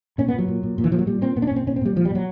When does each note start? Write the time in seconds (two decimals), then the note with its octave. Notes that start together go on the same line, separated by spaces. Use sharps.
0.18 A#2 C#4
0.28 B3
0.33 A#2
0.39 F#3
0.48 A#2
0.63 A#2
0.78 A#2
0.84 E3
0.92 A#2 F3
0.99 F#3
1.07 A#2 G3
1.21 A#2 C4
1.36 A#2 B3
1.42 D4
1.47 C#4
1.51 A#2
1.56 C4
1.67 A#2 C#4
1.76 C4
1.81 A#2 G3
1.96 A#2 F3
2.05 G3
2.10 A#2 F#3